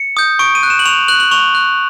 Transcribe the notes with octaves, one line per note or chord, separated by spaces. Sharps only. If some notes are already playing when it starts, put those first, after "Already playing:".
Already playing: C#7
D#6 G6
C#6 D7
D#7
F#6
E7
F#7
C#6 F7
F#6 F#7
F#7
C#6 F7
F#6